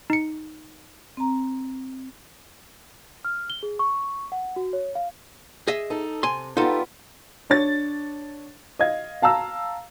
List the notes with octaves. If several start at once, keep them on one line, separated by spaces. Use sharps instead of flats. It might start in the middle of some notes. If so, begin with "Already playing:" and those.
D#4 C#7
C4 A#5
F6
G7
G#4
C#6
F#5
F#4
C#5
F5
G#4 D#5 E5
D#4 A4
C3 G#5 C6
G3 B3 D#4 F4 A4
D4 C#5 A6
D#5 F5 G#6
F5 A5 A#5 E6